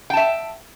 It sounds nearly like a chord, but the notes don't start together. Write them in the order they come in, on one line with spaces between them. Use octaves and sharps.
G5 A5 E5